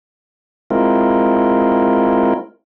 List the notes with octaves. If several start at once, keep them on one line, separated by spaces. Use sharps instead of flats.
G#3 C4 E4 F4 A#4